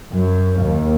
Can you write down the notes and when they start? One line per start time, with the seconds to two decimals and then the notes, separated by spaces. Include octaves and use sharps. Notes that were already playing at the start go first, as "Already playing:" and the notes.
0.14 F#2
0.62 D#2